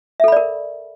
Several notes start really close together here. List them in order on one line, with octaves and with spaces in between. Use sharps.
E5 A4 B5 D5 A#4